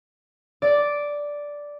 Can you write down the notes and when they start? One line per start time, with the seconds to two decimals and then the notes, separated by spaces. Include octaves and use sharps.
0.62 D5